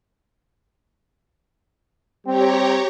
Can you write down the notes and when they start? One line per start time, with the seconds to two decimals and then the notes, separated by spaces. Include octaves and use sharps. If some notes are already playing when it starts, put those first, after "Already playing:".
2.26 G3 C4 G4 C#5 A#5